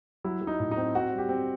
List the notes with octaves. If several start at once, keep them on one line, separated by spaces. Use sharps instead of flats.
F#3 E4
F#3
D#4
A2
D#4
C4
C4 F#4
G3
G4
C4